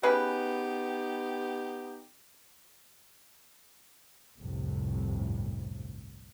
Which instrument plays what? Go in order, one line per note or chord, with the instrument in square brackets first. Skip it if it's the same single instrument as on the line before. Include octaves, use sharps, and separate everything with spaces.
[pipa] C#3 G#4 B4 [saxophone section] B3 D#4 G4
[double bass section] G1 C2 F2 A2 C3